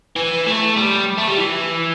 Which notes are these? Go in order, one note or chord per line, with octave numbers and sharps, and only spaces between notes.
E3
A3
G3
A3
G3
E3